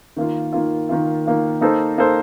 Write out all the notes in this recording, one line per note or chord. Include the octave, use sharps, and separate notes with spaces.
D#3 A#3 F4
D#3 A#3 F4
D#3 A#3 F4
D#3 A#3 F4
A#3 D#4 A4 C5
A#3 D#4 A4 C5